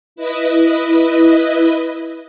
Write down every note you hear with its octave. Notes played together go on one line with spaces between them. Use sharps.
E4 B4 D#5